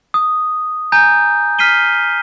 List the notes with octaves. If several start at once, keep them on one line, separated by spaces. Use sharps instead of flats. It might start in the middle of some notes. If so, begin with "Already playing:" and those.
D#6
G#5 A#5 G6
F6 B6 C7 D#7 G7